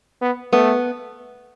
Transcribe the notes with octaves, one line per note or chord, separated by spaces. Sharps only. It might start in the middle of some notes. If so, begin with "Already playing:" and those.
B3
A3 B3